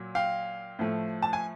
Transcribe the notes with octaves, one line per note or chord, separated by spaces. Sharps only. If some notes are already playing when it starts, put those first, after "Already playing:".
Already playing: A#2 F#3
F5 G5
A2 F3 A3
A5
G#5